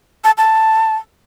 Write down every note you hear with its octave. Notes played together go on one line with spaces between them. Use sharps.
A5
A5